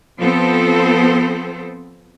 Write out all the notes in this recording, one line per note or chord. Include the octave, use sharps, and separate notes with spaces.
F3 B3 C4 A4 C5